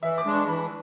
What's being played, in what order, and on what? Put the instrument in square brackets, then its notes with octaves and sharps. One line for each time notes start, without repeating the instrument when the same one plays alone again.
[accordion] E3 [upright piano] E5
[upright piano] D6
[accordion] G#3 D4
[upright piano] C#6
[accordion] E3 [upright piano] B5